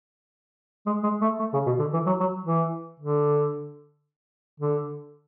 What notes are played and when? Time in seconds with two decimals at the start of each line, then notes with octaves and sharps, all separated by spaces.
0.86 G#3
1.03 G#3
1.21 A3
1.39 A3
1.53 C#3
1.66 B2
1.79 D3
1.93 E3
2.06 F#3
2.20 F#3
2.45 E3
3.00 D3
4.60 D3